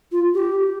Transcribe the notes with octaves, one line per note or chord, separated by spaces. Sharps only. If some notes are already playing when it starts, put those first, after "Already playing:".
F4
G4